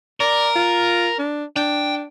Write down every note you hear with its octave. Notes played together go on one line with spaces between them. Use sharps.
A#4 D5
F4
D4
D4 G5